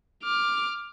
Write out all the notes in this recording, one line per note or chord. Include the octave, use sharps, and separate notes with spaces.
D6 F6